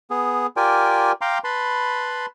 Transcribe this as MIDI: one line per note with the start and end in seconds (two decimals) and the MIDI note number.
0.10 0.47 59
0.10 0.47 68
0.57 1.12 65
0.57 1.12 67
0.57 1.12 70
0.57 1.12 74
0.57 1.12 79
0.57 1.12 80
1.21 1.38 77
1.21 1.38 79
1.21 1.38 82
1.21 1.38 84
1.21 1.38 86
1.44 2.26 71
1.44 2.26 81
1.44 2.26 83
1.44 2.26 84